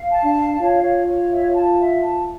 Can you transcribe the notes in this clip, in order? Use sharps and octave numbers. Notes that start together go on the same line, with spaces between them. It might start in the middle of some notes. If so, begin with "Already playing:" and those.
Already playing: F5
A5
D4
F5
F4 C#5
C#5
C#5
E5
A5
E5
A5